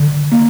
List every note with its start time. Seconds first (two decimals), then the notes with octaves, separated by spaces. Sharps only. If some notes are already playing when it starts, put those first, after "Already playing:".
Already playing: D3
0.32 A#3